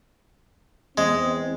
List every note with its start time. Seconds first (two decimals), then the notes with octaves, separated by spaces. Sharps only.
0.98 E2 G#3 C4